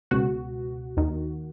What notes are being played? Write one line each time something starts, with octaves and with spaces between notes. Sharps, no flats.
C#2 B2 F#4
D#2 D#3